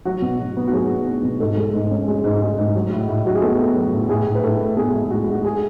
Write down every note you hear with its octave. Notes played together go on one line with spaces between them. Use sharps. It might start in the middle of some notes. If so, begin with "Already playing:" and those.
F#3 F#4
B2
F#3
B3
F#4
F#3 G#4
B3
B3
B2
G#2 A4
G#3
G#2
C#4
G#3
G#2
G#3
G#2
F#3
A2
A2
F#3 F#4
G#4
B3 A4
B3
F#3
A2
A2 G#4
A2
B4
A2 A4
A2
B3 G#4
G#3
A2 F#4
G#3
F#4
G#4